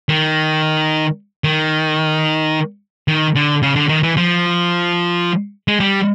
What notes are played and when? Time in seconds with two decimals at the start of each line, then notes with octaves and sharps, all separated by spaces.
0.09 D#3
1.44 D#3
3.08 D#3
3.35 D3
3.62 C#3
3.75 D3
3.89 D#3
4.03 E3
4.17 F3
5.68 G#3
5.80 G3